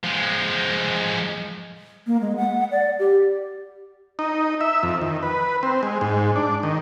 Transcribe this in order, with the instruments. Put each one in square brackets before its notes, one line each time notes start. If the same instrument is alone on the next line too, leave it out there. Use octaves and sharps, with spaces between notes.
[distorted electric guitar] F3 G#3
[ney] A#3
G#3
F#5
D5
G4
[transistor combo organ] D#4
E5
F2
D#3
B4
C4
G#3
G#2
D4
D#3